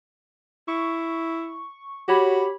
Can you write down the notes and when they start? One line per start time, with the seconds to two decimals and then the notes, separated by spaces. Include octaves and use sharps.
0.68 E4 C#6
2.08 F#4 G4 C#5 B5